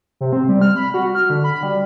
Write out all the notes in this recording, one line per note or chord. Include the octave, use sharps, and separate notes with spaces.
C3
C4
G3
F6
B5
F#4
F6
D3
B5
G3